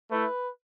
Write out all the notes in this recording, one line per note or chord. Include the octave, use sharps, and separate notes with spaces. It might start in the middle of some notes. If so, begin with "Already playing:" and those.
A3 E4 B4